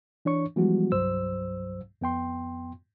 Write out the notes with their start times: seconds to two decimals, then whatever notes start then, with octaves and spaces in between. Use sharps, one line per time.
0.25 E3 D4 C#5 C#6
0.56 E3 F3 G3 G#3 B3 F#4
0.92 C2 G2 F#3 C5 E6
2.01 F2 B3 G5 C6